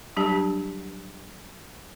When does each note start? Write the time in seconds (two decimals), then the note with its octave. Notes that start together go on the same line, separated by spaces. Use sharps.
0.17 F#3 G3 D4 G4 A5